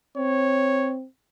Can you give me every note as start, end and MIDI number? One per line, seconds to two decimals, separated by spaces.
0.17 1.05 60
0.17 0.94 73